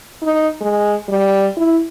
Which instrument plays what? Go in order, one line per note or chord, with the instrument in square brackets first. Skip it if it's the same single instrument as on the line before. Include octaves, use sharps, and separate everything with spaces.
[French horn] D#4
G#3
G3
E4